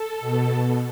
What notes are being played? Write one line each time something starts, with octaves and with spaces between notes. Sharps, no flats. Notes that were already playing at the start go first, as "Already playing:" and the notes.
Already playing: A4
B2